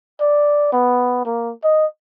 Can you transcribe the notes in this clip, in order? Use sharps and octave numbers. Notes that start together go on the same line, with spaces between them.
D5
B3
A#3
D#5